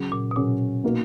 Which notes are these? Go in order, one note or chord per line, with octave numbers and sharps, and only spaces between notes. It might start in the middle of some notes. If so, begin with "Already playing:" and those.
Already playing: C#3 F#3 C#4
A#2
B2
A#2 C#3 F#3 C#4
B2 A#3 D#4 F#4 A#4